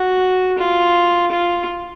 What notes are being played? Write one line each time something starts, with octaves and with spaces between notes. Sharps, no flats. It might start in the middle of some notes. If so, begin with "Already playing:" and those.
Already playing: F#4
F4
F4